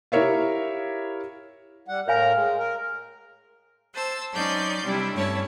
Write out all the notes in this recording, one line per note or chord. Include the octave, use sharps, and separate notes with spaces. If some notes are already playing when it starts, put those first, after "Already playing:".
E4 G4 A#4 C#5 E5 F5
G3 F#5
A2 A#4 C#5 F5 G#5 A#5
G#3
A#4
C5 A5 E6
F#3 C#4 D#4 D5 C6 G6
C3 G3 D4 E4
G2 A3 C#4 E4 C#5 A5